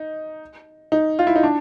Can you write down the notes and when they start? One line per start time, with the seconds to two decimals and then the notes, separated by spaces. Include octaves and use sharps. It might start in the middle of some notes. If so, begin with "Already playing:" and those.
Already playing: D#4
0.92 D#4
1.19 F4
1.27 E4
1.36 D#4
1.43 D4